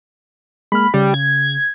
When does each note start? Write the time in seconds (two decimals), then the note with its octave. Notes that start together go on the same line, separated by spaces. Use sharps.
0.72 G#3 A#3 B5 F6
0.94 C#3 G3
1.14 G#6